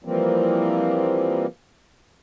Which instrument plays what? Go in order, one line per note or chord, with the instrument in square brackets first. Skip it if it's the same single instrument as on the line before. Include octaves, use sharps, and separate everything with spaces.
[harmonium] E3 F3 G3 A#3 C4